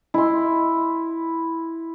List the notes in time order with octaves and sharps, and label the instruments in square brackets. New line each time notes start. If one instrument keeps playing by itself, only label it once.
[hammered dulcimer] E4 C6